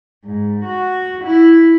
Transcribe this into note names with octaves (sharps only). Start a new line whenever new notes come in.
G#2
F#4
E4